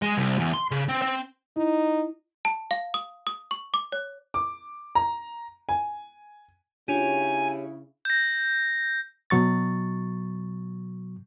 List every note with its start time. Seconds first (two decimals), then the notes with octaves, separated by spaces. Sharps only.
0.02 G#3
0.18 C2
0.39 E2
0.53 C6
0.71 C#3
0.89 C4
1.02 C4
1.56 D#4 E4
2.45 A5
2.71 F5
2.94 D#6
3.27 D#6
3.51 C#6
3.74 D6
3.92 C#5
4.34 D6
4.95 A#5
5.69 G#5
6.88 C#3 D4 E4 F4 G4 C#5 G#5
8.05 G6 A#6
9.30 B2 F#3 C#6 A6